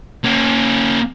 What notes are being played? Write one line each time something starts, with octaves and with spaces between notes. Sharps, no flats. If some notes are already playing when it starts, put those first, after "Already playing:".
A#3 C#4